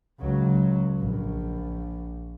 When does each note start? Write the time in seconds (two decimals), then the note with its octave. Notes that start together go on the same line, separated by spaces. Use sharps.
0.20 C#2 F#3
1.00 A#1